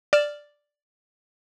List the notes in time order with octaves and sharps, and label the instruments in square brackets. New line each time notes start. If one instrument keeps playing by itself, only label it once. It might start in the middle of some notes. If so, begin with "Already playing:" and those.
[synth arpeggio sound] D5 F6 E7